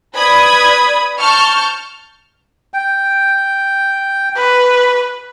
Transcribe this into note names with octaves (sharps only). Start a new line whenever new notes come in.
B4 D5 B5 D#6 G#6
A5 C#6 F6 G6
G5
B4